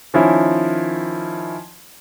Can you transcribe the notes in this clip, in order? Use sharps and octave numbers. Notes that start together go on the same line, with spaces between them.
D#3 F3 C#4 E4